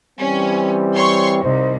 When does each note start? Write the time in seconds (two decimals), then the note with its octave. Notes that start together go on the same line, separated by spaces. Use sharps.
0.19 E3 G3 C4 C#4
0.96 C#5 C6 C#6
1.43 C2 D#4 C5